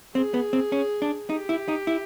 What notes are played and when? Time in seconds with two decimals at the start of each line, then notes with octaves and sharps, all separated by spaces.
0.15 C4 G#4
0.34 B3
0.53 C4
0.72 C#4
1.02 D4
1.30 D#4 G4
1.49 E4
1.68 D#4
1.87 E4